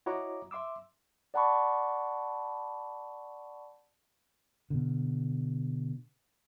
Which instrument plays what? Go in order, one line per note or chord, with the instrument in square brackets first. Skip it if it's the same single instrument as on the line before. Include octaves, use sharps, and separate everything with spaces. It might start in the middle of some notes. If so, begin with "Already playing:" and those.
[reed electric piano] E4 F#4 C#5 D#5 A#5 D6
E5 C6 D6 E6
[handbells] D5 F#5 A5 B5 C#6 D6
[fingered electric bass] B2 D3